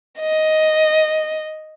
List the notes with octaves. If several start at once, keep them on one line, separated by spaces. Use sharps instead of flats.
D#5